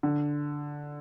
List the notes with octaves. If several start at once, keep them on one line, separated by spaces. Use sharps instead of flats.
D3